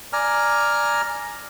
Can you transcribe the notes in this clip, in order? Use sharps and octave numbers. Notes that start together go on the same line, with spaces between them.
D5 G#5 A#5 F6